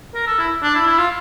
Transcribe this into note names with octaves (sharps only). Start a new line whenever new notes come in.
A#4
A4
E4
D4
E4
E4
F4